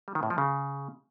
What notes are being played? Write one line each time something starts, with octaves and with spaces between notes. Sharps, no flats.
G3
D#3
A2
F3
C#3